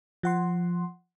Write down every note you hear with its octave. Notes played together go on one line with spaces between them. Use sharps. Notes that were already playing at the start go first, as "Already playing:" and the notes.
F3 F#5 C6